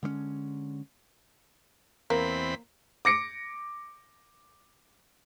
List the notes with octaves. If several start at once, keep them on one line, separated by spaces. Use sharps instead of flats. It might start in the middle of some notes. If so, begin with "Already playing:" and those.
D3 G#3 A3 C#4
E2 A#3 C4 B5
D6 A#6 C#7 D7